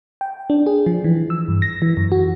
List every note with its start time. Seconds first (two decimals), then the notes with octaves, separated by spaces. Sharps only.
0.21 G5
0.50 D4
0.66 G#4
0.86 F3
1.04 E3
1.30 E6
1.48 G2
1.62 A#6
1.82 E3
1.97 F#2
2.12 F#4